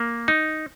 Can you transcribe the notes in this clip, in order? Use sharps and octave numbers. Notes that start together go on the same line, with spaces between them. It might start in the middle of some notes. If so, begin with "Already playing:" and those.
Already playing: A#3
D#4